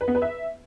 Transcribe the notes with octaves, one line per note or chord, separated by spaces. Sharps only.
B4
B3
B4
E5